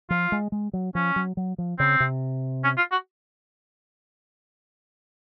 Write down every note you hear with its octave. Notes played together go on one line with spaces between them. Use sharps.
F3 F4
G#3
G#3
F#3
F3 C#4
F#3
F#3
F3
C#3 C4
C3
C#4
F4
F#4